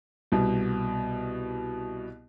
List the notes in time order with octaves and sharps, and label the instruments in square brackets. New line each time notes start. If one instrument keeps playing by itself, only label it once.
[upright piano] C2 B2